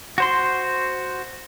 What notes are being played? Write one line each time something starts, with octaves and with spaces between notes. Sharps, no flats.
F#4 C5 C6